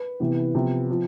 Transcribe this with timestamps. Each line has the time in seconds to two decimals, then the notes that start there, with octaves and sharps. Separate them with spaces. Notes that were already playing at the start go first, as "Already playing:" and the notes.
Already playing: B4
0.20 C3 E3 B3
0.55 C3 F3 B3
0.90 F3